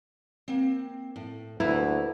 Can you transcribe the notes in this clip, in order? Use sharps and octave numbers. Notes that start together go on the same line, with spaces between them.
A#3 C4
A2
D2 A#3 E4 B4 A#5